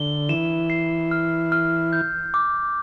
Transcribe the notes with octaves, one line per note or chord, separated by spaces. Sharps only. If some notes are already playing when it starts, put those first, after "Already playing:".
Already playing: D3 G7
E3 E7
C7
F6
F6
G6
D6